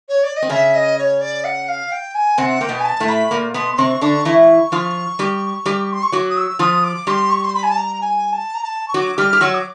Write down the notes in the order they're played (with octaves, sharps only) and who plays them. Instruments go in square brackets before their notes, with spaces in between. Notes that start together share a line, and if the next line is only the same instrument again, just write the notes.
[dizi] C#5
D5
D#5
[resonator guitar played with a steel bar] C4
[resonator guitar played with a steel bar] C#3 C#4 [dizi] E5
[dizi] D#5
C#5
D5
F#5
F5
G5
G#5
[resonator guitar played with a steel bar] C3 C4 [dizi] F#5
[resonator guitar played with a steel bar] A#3 [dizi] G5
[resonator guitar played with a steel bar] B2 B3
[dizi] G#5
A5
[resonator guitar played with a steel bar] A2 A3
[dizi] B5
[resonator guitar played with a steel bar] A#2 A#3
[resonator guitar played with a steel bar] B2 B3 [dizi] C6
[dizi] C6
[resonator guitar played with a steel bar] C3 C4 [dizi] C#6
[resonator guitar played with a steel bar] D3 D4 [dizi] C#6
[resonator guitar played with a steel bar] E3 E4 [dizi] C#6
[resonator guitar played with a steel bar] F3 F4
G3 G4
G3 G4
[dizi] C6
C#6
[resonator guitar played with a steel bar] F#3 F#4 [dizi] D6
[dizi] D#6
E6
[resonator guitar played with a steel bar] F3 F4 [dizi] D#6
[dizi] D6
[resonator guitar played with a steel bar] G3 G4 [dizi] C6
[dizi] C#6
C6
B5
G#5
A5
A#5
G#5
A5
A#5
A5
C#6
[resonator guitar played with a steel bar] F#3 F#4 [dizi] D6
[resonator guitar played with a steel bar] G3 G4 [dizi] F6
[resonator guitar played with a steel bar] G4
[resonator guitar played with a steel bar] F#3 F#4 [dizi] E6
[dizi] D6